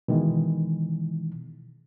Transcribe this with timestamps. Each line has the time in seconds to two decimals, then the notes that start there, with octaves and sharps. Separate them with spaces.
0.08 B2 D#3 E3 G#3